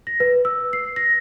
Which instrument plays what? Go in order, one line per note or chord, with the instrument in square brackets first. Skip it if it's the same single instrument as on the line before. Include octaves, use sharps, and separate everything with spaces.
[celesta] A#6
B4
E6
C7
A#6